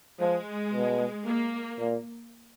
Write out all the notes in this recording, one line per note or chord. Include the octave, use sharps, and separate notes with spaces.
F3 G#3
B2
A#3
A#2